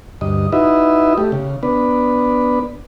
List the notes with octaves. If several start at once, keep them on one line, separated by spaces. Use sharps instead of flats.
D2 G2 D#5
D#4 E4 F#4 B4 D#5 E5
A3 G4
C#3
B3 D4 B4